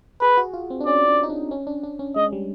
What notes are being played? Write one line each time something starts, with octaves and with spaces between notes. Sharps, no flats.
G#4 B4
F#4
F4
C4
D4
C#4 D5
D4
D#4
D4
C#4
D4
D4
C#4
G#3 D#5
G3